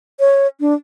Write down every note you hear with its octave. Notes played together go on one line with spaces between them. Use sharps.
C#5
D4